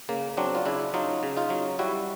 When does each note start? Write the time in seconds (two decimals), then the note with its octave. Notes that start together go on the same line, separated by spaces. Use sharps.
0.09 C#3 A#3
0.37 F#3 C4 D4
0.55 F4
0.66 C#3 D4 E4
0.94 F#3 D#4 F4
1.23 C#3
1.37 D#4 F4
1.50 F#3
1.79 G3 E4 F#4